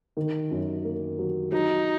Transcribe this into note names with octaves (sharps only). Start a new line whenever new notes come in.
D#3
F#2
A#3
F#3
F#3 D#4